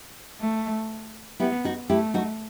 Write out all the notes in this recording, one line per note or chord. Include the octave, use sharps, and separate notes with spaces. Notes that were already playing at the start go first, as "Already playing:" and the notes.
A3
B3 E4 G4
D#4 F#4
A3 E4 G4
D#4 F#4